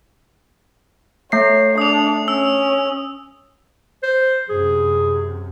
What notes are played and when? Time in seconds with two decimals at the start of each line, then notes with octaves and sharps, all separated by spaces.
1.32 A3 C#5 C7
1.78 D4 D#6 F7
2.28 C#4 E6
4.03 C5
4.49 F#2 C3 G#4